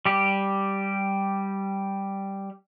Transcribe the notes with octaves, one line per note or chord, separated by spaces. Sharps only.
G3 G4